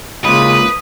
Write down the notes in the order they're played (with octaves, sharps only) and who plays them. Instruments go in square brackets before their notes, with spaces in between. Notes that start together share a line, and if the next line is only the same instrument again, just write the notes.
[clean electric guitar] C#2 A#2 [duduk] C#3 [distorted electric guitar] B4 [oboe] D#6